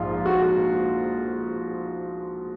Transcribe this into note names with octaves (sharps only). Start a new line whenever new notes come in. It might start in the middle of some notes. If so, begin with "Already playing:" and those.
Already playing: A#1 G#2 F3 F4
F#4